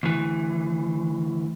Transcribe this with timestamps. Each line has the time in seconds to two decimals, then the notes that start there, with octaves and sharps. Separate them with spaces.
0.03 D2 E3